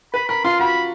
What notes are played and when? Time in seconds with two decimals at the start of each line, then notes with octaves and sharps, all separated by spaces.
0.14 B4 B5
0.29 A#4 B5
0.44 F4 C6
0.60 F#4 B5